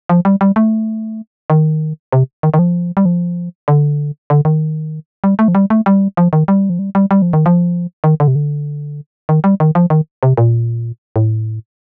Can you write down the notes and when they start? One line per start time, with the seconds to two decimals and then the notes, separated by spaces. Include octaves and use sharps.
0.09 F3
0.25 G3
0.41 G3
0.56 A3
1.50 D#3
2.13 C3
2.43 D#3
2.54 D#3
2.59 F3
2.97 G3
3.05 F3
3.68 D3
4.30 D3
4.45 D#3
5.24 G3
5.39 A3
5.48 F3
5.55 G3
5.70 A3
5.86 G3
6.17 F3
6.33 D#3
6.48 G3
6.70 F3
6.79 G3
6.95 G3
7.11 G3
7.22 F3
7.33 D#3
7.46 F3
8.04 D#3
8.20 D3
8.28 C3
8.35 D3
9.29 D#3
9.44 G3
9.60 D#3
9.75 F3
9.90 D#3
10.23 C3
10.37 A#2
11.16 A2